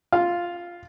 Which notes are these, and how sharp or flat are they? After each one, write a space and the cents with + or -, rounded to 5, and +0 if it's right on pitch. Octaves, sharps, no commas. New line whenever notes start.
F4 +0 F5 +0